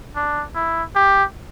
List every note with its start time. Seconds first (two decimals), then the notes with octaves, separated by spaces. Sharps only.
0.16 D4
0.55 E4
0.96 G4